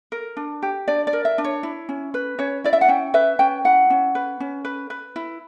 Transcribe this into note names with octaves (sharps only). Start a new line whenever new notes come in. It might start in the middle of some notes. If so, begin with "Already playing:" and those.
A#4
D4
G4
D4 D5
D5
A#4
E5
D4
C#5
E4
C#4
B4
C#4 C#5
E4 D5
E5
F#5
C#4 G5
B4 E5
C#4 G5
E4 F#5
C#4
B4
C#4
B4
B4
E4